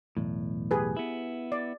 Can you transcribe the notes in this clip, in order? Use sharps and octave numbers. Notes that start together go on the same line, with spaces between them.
B1 E2 A2
G4 G#4 B4
B3 E4
D5